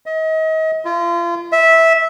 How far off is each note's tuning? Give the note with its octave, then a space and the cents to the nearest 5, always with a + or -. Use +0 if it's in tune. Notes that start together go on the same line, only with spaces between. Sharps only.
D#5 +35
F4 -35
E5 -10